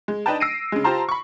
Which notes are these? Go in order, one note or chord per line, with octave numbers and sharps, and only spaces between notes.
G#3
D4 D#4 B4 G5 A5
E6 A#6 C7 D7 D#7
C#3 G#3
F4 G4 C5 A5 A#5 C6
B5 C#6